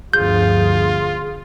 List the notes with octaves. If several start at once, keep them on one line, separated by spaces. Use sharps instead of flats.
G1 D2 F3 F4 G#4 G6